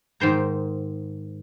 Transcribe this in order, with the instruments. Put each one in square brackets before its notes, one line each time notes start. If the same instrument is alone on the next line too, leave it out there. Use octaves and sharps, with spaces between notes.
[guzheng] G#2 D#3 C5 A#5